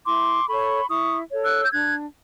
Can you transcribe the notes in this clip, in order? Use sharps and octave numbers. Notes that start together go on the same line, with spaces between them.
E4 C6 D6
A4 C#5 B5 C#6
E4 C#6 D#6
A4 C#5
E6 F#6
G6
D4 F#6 G#6